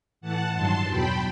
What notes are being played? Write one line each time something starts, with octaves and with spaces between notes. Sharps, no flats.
A2 E3 F#5 A5
G2 D#3 F#3 A5 C6
E2 B2 F#3 G5 B5